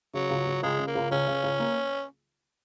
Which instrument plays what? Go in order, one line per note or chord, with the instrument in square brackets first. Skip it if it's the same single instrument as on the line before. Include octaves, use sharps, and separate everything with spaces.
[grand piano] C#3 [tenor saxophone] F#3
[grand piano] C#2
C#2
[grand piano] C#2 [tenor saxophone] G#3
[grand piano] C#3
[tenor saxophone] A#3
[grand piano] C#2
[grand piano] C#2 [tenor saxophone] C#4
[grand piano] C#3
C#2
A#3